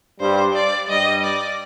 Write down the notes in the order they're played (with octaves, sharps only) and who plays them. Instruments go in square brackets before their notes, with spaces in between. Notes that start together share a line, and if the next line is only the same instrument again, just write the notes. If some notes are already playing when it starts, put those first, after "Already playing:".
[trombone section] G2 G3 [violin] C5
[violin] D5
[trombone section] G2 G3 [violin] D#5
[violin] D5